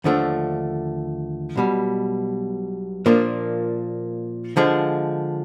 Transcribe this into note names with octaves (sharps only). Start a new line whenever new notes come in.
D#2 D3 F3 A3 D4
B1 B2 G3
A#2 F3 A#3 D4
D3 F3 G#3